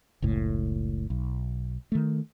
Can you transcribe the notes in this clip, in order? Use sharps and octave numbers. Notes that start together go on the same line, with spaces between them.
F#1 C#2 A2
B1
D#3 A3